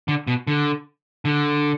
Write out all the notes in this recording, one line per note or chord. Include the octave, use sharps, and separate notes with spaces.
D3
B2
D3
D3